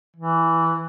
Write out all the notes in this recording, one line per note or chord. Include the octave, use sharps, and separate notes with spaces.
E3